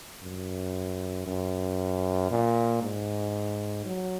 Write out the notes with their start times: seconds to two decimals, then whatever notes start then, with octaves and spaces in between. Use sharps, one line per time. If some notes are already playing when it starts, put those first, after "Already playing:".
0.23 F#2
1.27 F#2
2.31 A#2
2.82 G#2
3.85 F#3